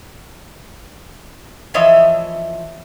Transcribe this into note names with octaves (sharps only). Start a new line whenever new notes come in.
E3 F3 C#5 D#5 E5